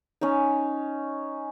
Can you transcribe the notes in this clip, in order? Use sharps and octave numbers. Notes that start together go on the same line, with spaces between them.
C#4 D#4